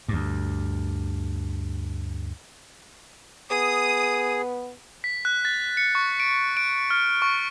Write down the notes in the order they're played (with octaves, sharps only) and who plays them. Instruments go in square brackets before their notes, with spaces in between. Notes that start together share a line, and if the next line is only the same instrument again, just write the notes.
[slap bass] D2 G2
[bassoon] B3 [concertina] G#4 [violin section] D#6
[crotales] B6
F#6
A6
C#7
C#6
D7
D7
F6
C#6